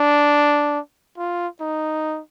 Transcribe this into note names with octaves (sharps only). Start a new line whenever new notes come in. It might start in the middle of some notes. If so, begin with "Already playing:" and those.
Already playing: D4
F4
D#4